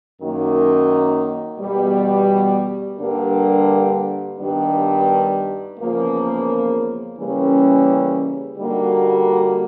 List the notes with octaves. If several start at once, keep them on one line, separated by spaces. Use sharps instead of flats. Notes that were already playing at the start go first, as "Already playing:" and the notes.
F#2 D#3 F#3 A#3 D#4
E2 B2 G3
G2 D3 G3 A#3 D4
G2 D#3 G3 B3 D4
E2 C#3 F3 A#3
C#3 E3 G3 A#3 C#4
D3 G3 A#3 D#4 F#4